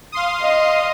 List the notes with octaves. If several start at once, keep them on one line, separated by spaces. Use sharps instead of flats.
F5 C6 D#6
D#5